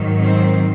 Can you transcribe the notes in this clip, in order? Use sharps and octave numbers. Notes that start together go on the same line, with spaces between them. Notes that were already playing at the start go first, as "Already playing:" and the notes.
Already playing: G#2 D#3 F#3
C4